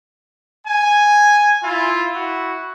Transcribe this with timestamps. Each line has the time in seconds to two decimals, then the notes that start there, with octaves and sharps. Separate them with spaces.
0.66 G#5
1.62 E4 F4
2.12 E4 F#4